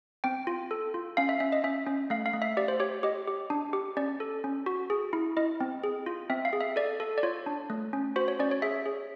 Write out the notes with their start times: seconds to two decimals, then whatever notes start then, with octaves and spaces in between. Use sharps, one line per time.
0.24 C4 G5
0.47 F4
0.71 A4
0.94 F4
1.17 C#4 F5
1.29 E5
1.40 C#4 E5
1.52 D#5
1.64 C#4 E5
1.87 C#4
2.10 A3 F5
2.26 F5
2.33 A3
2.42 E5
2.57 G4 D5
2.68 C5
2.80 G4 C#5
3.03 G4 D#5
3.27 G4
3.50 D4
3.73 G4
3.97 C#4 D5
4.20 A4
4.44 C#4
4.66 F#4
4.90 G#4
5.13 E4
5.37 E4 D#5
5.60 C4
5.84 G#4
6.06 F4
6.30 C4 E5
6.45 F5
6.53 G#4
6.61 E5
6.76 A4 D5
7.00 A4
7.18 D5
7.23 F4 C#5
7.46 D4
7.70 A3
7.93 C#4
8.16 F#4 C5
8.28 C#5
8.39 C#4 D5
8.51 C#5
8.62 G#4 E5
8.86 G#4